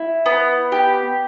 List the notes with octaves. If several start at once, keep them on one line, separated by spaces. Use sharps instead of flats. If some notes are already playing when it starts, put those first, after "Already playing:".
Already playing: E4
B3
G4